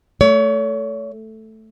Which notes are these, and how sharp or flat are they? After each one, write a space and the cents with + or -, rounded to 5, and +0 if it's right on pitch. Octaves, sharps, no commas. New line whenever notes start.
A3 +0 C#5 +35